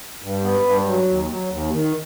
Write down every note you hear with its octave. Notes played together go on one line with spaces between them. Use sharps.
G2
B3
G2
F#3
D#2
F#3
D#2
D#3